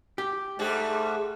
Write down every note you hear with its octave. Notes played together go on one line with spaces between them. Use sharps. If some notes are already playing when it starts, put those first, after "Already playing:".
G4
G#2 G3 A3 G#4